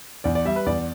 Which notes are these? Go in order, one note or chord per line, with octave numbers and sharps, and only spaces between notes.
E2 D5
D5
G3 E5
B4
E2 D5